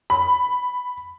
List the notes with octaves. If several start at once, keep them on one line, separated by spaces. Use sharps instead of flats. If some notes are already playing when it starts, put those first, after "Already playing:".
B5